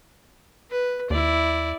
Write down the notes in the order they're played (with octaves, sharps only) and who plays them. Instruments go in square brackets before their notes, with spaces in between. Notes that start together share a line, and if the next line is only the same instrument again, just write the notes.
[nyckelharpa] B4
[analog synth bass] D#2 [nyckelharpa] E4 D5